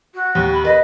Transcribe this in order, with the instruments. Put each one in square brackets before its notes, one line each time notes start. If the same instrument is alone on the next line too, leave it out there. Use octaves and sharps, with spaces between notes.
[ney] F#4
[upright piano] D#2
[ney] B5
[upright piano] B4 [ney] D#5